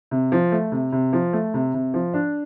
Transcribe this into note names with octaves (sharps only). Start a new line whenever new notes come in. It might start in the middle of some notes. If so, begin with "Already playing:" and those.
C3
F3
A3
C3
C3
F3
A3
C3
C3
F3
D4